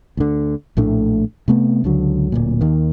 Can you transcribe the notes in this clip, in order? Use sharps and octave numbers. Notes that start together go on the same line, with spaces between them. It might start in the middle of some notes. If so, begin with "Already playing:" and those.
D2 D3
A#1 A2 A3 D4
C3 A3 B3
C#2 D3 F#3
D1 G1 A#2
D#2 D#3